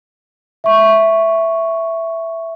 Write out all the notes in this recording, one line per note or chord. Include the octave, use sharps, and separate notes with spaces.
E5 C#6